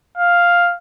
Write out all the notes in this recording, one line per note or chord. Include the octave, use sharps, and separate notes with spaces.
F5